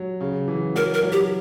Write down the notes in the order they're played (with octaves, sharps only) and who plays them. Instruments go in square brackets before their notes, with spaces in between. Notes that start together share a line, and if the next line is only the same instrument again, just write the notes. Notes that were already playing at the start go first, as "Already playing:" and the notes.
Already playing: [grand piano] F#3
C#3
E3
[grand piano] F#3 [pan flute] A#4
[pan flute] A#4
[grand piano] F#3
[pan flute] G4